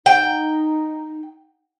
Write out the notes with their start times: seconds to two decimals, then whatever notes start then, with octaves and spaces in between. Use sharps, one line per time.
0.06 D#4 G5